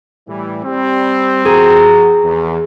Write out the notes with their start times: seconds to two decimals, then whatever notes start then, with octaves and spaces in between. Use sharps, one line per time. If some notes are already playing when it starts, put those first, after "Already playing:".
0.28 A2 E3 G3
0.65 G3 C4
1.45 F3 F#4 G#4 A#5
2.24 E2